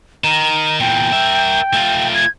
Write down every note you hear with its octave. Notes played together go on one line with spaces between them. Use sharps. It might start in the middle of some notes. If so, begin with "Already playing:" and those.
D#3 A#5
E2 A#2 G5
A#4 E5
A3 F4
G#6